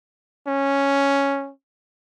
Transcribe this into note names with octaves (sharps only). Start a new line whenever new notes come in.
C#4